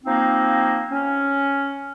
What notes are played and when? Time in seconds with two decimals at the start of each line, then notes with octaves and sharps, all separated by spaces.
0.04 F3 A#3 C4 D#4
0.90 C#4